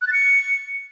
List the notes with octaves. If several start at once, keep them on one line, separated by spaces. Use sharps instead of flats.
F#6
A6
C#7